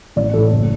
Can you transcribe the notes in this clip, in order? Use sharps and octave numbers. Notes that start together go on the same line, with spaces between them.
A1 D5
A2 E3 A4
F#1